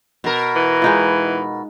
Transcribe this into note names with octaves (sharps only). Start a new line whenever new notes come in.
B2 A#4
E3
G#3 D#4 F4